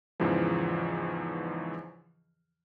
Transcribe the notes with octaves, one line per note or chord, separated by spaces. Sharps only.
E2 G#2 C#3 E3 F3